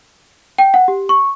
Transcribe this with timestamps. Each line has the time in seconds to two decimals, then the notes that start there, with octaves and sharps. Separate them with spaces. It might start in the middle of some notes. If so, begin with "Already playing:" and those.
0.58 G5
0.74 F#5
0.88 G4
1.09 C#6